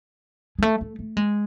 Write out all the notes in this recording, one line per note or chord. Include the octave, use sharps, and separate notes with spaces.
G#3
A3
A3
A3
G#3